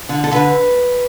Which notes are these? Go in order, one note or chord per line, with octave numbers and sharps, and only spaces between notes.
D3
A4
D3 B4